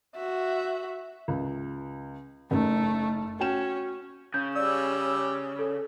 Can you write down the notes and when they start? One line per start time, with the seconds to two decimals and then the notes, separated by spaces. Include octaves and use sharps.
0.15 F#4 E5
1.28 C#2
2.51 F#1 A3 D#4
3.40 C#4 F#4 G5 E7
4.34 C#3 G6
4.56 G3 C#4 D5 E6
5.59 A4